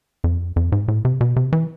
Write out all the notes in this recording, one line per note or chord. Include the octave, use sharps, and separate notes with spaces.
F2
F2
G#2
A2
C3
B2
C3
E3